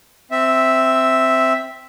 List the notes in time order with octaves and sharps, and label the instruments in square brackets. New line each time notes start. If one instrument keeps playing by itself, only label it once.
[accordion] C4 E5